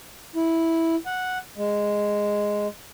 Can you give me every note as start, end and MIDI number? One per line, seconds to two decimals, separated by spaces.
0.36 0.96 64
1.06 1.38 78
1.57 2.68 56